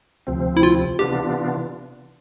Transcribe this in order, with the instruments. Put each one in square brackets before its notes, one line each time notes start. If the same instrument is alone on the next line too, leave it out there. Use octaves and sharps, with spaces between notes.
[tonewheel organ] D2 C3 F3 C4
[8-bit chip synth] E4
F4
[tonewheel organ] C3 E3 B3 D4 F4 [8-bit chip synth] G4